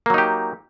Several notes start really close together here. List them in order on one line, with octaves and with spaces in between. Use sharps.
A#3 F#3 D#4 G4